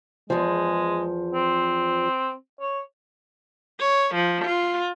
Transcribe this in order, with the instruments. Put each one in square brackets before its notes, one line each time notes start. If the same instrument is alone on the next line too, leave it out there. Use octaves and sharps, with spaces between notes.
[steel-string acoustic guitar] E2 F3 [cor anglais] G#3
[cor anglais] C4
C#5
[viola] C#5
F3
F4